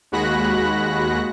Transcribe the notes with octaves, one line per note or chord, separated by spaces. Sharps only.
D#2 G#3 F#4 B5 F#6 A#6